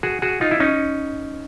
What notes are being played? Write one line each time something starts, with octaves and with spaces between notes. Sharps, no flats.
F#4 G#4
F#4 G#4
D#4 F4
E4
C#4 D#4